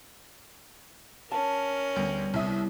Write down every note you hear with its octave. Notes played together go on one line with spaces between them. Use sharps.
C#4 A#4 A5
D2 G3 B3 D4
C2 E4 E5 D#6